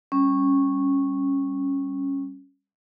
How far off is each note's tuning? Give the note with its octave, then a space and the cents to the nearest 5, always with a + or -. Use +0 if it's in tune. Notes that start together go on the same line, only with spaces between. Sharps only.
G3 +5 C#4 -10